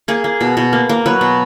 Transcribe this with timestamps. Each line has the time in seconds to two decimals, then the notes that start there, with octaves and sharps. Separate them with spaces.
0.08 A#3 G#4
0.24 A#3
0.41 B2
0.57 B2
0.73 A#3
0.89 A#3
1.06 F#3 B4
1.21 B2